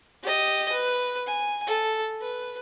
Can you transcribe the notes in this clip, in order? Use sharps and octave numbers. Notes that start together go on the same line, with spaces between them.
G4 D#5
B4
G#5
A4
B4